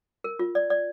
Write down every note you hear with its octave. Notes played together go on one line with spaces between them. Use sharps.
A#4
F4
D5
D5